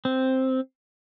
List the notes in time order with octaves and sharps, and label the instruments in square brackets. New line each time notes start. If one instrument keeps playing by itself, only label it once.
[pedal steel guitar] C4